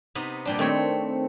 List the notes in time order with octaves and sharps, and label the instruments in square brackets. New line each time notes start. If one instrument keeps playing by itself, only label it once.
[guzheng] C3 B3 D#4
A#2 G3 D4
[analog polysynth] D#3 C4 [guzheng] A3 C#5